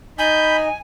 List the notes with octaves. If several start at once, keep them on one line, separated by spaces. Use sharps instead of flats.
D#4 G#5 B5 G6